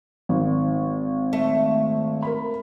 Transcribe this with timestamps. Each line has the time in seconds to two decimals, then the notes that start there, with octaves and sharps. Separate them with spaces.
0.29 G#1
1.33 A3
2.22 A#4 B5